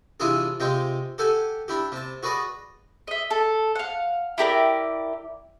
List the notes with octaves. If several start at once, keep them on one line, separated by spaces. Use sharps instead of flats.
C3 E3 D4 E4 F4 G#4
C3 G#3 F4 G5
G4 A4 F#5 G#5
D4 E4 G4
C3 A5
F#4 G#4 B4 D5 D#5
D#5 E5
A4
F5 F#5
E4 G4 A#4 D5